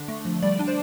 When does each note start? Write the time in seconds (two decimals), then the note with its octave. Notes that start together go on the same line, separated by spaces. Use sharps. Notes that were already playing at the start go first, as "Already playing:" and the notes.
Already playing: D3 D4
0.08 A3
0.25 F3
0.42 G3 D5
0.59 D4
0.68 C5